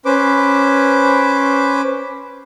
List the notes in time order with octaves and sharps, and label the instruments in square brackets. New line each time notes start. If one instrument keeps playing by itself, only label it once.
[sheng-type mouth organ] C#4 B4 C5 D6